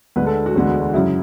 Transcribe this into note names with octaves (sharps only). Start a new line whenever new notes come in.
D2 D3 G#3 B4
A4
F#4
E1 D2 D3 G#3 B3
F#2 C#3 F#3 E4